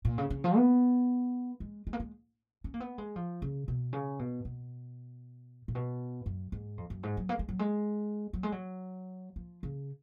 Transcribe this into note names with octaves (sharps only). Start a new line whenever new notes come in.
A#2
C#3
C#3
F3
B3
G#3
G#3
A#3
G#3
C#4
A#3
B3
G#3
F3
C#3
B2
C#3
B2
B2
A#2
B2
F#2
G#2
F2
F#2
G#2
F#3
A#3
G#3
F#3
G#3
F#3
G#3
F#3
F3
C#3